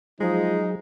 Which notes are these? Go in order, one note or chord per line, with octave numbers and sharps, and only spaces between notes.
F3 F#3 G#3 D#4 G#4